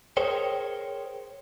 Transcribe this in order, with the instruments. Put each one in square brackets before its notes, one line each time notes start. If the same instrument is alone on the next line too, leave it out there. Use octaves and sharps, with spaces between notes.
[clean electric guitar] G#4 A#4 C5 C#5 G5